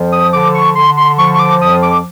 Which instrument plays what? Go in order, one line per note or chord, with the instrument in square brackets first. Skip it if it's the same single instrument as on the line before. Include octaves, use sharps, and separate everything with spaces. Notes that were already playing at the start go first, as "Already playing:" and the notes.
Already playing: [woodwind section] F2 F3
[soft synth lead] D#6
[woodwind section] D3 [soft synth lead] D6
[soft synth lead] C#6
[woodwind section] D3 [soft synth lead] C6
[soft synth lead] C6
[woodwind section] F3 [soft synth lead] C#6
[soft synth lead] C#6
D6
[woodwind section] F2 [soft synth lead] D#6
[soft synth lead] D6